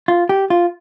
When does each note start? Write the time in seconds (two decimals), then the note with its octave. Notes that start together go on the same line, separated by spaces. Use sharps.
0.08 F4
0.29 G4
0.50 F4